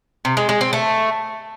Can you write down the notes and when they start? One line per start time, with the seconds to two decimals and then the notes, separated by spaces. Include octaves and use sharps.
0.25 C3
0.37 G#3
0.49 G#3
0.61 C4
0.73 A3